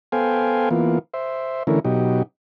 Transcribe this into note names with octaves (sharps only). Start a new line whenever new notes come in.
B3 A4 C5 F5 G5 G#5
E3 A#3 B3 F4
C5 E5
D3 E3 A3 C#4 E4 A#4
B2 F#3 D#4 G4